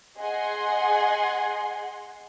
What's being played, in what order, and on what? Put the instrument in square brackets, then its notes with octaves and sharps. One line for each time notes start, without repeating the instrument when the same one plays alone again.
[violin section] G#4 D#5 F#5 G#5 C6